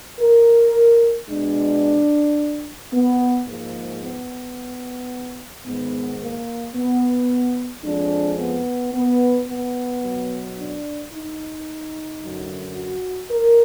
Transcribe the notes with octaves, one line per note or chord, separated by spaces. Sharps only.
A#4
B2 G#3 D4
B3
G#2 F3 G#3 A#3
B3
G#2 D#3 G#3 B3
A#3
B3
F2 F3 G#3 D4
B3
B3
B3
B2 F#3
D4
D#4
F#2 D3 F#3
F#4
A#4